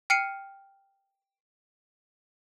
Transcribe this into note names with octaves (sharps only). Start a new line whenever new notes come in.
G5 F6 C7 C#7 D#7